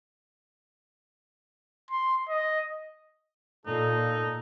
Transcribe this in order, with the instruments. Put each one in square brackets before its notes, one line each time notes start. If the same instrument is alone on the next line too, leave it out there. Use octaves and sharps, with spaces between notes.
[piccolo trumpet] C6
D#5
[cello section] A#2 [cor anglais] D#4 [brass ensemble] A4